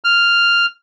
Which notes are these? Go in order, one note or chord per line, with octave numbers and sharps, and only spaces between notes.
F6